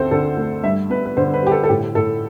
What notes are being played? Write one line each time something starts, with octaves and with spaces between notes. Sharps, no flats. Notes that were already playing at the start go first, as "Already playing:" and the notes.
Already playing: D2 C4 A4 C5
D3 A4
A3
G2 E5
B3 B4
B4
D3 C5
B4
G3 G4
A4
A4
A2 G4
A2 A4